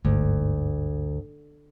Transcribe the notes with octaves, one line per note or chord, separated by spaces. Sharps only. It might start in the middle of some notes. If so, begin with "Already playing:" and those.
G1 D2 G#2